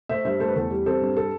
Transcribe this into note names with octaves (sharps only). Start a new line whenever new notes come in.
A3 C5 E5
G2 C5 E5
A3 A4 C5
B4
E2 A4
G3
C4 A4 C5
G2
A4